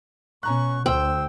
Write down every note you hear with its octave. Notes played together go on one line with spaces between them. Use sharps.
B2 C#4 A#5 C#6 F#6
D2 C5 G5 E6